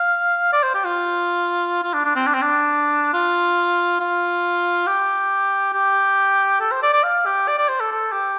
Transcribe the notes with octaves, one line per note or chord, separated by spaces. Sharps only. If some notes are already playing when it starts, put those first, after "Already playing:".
Already playing: F5
D5
C5
G4
F4
F4
D4
D4
C4
D4
C4
D4
F4
F4
G4
G4
A4
C5
D5
D5
F5
G4
D5
D5
C5
A4
A4
G4